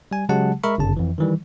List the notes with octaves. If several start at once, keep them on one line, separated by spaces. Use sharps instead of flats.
G3 G#5
C#3 F#3 G#3 G4 F#5 A5
G#3 A#4 E5 B5 C#6
G1 F#2 C#3 A5
F2 E3
D#3 E3 G3